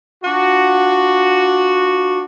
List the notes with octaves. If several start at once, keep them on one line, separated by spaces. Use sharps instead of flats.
D4 F4 F#4